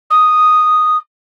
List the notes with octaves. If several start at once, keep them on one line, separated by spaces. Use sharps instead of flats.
D#6